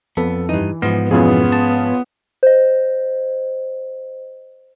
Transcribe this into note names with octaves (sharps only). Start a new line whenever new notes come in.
F2 B3 A4
G2 E3 D#4
G#2 F3 B3
F2 B2 E3 B3 C#4 F4 G#4
A5
C5 D#5